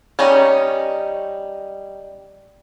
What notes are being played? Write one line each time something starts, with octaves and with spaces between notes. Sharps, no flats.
G3 C#4 D#4